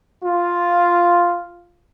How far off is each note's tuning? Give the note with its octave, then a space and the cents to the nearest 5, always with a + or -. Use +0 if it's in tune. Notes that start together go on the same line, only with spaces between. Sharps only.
F4 +0